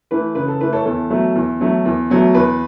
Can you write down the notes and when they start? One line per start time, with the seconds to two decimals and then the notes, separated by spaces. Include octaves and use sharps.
0.11 E3 A3 B4
0.35 C#3 B4
0.48 A4
0.61 E3 A3 B4
0.73 A4 C#5
0.86 E2 A4
1.10 B2 F#3 A3
1.35 E2
1.60 B2 F#3 A3
1.85 E2
2.10 B2 F#3 A3
2.34 E2 B4